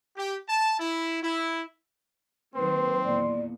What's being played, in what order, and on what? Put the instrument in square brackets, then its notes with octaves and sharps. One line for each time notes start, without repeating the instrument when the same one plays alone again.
[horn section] G4
A5
E4
E4
[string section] D#3 F#3 A#3 [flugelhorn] C4 [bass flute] B4 [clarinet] C6
[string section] E2 A#2 [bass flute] D5